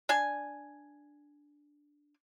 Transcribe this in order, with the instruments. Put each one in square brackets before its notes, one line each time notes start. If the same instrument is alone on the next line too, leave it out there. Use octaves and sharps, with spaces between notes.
[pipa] D4 G#5